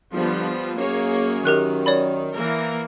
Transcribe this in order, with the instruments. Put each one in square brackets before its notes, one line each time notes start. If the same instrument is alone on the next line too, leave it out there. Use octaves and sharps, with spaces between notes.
[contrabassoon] G1 [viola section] F3 G3 B3
[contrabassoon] F#2 [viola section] A#3 G#4 C#5
[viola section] D#3 [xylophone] G4 A#4 F#6
[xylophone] C#5 D5 B5
[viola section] E3 A#3 A#4